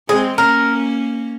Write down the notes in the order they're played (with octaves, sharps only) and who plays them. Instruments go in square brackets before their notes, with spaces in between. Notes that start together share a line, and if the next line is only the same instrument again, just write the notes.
[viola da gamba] G#3 C4 [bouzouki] G#4
[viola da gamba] A#3 C#4 [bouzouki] A#4